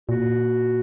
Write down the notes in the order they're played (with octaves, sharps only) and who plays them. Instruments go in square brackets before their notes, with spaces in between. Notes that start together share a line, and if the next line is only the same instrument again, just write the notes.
[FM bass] A#2 [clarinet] F#4